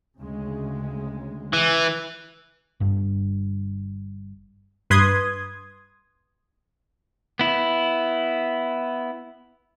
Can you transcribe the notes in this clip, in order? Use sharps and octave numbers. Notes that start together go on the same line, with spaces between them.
D2 C#3 G#3
E3
G1 G2
G2 B4 C6 D#6 G#6
B3 E4